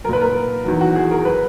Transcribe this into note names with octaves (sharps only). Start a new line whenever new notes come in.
A#2 F#3 A#4 B4
A#4
E2 D#3 F#3
F#4
G#4
A#4
F#3 B4